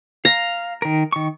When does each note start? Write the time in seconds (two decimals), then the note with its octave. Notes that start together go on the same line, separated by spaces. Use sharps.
0.25 F5 A#5
0.82 D#3 A#4
1.12 D#3 C#6